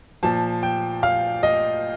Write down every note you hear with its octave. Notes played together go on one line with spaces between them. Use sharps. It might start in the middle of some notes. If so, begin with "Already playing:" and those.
A#2 F3 A5
G5
F5
D#5